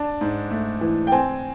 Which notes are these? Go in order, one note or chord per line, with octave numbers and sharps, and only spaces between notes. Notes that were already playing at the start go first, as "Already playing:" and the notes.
Already playing: D4 A5
G#2
A3
E3
G5
C4 G#5